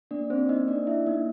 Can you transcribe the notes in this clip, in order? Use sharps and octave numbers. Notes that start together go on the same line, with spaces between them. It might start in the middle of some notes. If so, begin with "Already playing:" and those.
A#3 D4 D5
C4 C#4 C5
A#3 D#4 D#5
A#3 D4 D5
A#3 E4 E5
A#3 D#4 D#5